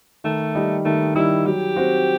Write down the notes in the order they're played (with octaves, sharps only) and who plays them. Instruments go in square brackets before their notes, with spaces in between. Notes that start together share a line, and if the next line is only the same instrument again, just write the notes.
[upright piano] D#3 [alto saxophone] A3
[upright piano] G3 D#4
[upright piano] D#3 [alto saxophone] A3
[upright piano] G3 D#4 [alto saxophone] E4
[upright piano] F#3 [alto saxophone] G4
[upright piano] C4 F#4 C5